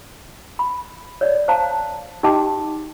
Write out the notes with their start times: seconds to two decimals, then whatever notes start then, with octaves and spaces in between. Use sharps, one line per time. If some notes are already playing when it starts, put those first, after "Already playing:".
0.59 B5
1.21 C#5 D5
1.48 C5 F5 A5 A#5
2.23 D#4 G4 D#5 G5 A5 D6